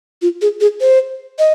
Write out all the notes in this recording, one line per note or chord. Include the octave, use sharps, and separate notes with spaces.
F4
G#4
G#4
C5
D#5